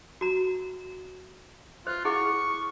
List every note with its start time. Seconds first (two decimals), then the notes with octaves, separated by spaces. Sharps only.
0.21 F#4 A#5
1.87 F4 C5
2.05 E4 G#4 F#5 C#6